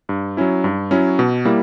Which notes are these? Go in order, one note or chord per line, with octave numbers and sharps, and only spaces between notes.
G2
F#3 C#4 E4
G2
F#3 C#4 E4
B2
G3 A#3 E4